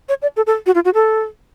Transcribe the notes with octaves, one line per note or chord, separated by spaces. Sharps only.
C#5
D5
A4
A4
F#4
F4
F#4
A4